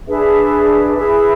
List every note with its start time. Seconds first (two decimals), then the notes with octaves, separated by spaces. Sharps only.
0.07 D4 G#4 B4 E5
0.94 E4 G#4 B4 E5